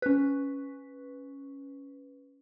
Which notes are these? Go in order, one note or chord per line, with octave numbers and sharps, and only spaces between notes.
C#4 B4